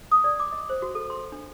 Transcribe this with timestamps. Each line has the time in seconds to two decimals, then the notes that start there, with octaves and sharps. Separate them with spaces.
0.11 D#6
0.24 D5
0.40 D6
0.52 D#5
0.70 C5
0.82 F#4
0.95 A4
1.10 C6
1.32 D4